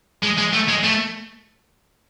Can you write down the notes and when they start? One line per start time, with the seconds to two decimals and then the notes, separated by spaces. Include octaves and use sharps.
0.23 G#3
0.38 G#3
0.53 A3
0.69 G#3
0.84 A3